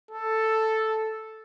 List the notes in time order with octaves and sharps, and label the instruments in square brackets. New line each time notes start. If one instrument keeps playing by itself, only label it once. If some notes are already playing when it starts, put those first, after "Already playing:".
[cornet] A4